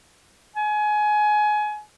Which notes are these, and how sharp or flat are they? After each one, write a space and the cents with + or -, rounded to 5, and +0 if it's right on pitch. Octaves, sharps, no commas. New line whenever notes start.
G#5 +25